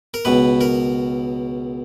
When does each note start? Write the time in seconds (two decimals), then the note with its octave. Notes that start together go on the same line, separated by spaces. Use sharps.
0.14 A#4
0.25 C#2 B2 B4
0.61 A#4